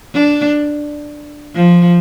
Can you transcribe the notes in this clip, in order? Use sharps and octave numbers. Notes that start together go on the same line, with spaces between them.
D4
F3